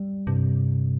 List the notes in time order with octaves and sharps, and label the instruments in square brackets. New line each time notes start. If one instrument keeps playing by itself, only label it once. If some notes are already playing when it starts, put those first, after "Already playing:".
Already playing: [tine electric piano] G3
[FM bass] G2 [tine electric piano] C3